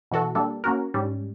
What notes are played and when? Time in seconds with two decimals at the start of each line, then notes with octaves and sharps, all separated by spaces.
0.11 B2 E3 F#4 A4
0.35 G3 A#3 D4 A4
0.64 A#3 C#4 F#4 A#4
0.94 G#2 G3 C#4